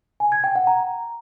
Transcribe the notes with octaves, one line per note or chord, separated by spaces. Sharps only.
G#5
G#6
G5
F#5
A#5